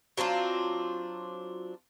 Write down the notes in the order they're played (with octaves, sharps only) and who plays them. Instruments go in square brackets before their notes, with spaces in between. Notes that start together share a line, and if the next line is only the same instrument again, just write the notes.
[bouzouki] F#3 C4 D4 F4